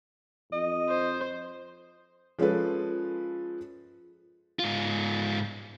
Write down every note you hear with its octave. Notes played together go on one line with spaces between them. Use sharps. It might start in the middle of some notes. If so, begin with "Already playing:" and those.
F2 D#5
C5
F3 G#3 C#4 F4 A4 B4
G#2 F4